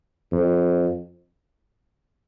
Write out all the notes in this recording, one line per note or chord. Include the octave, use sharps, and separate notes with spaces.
F2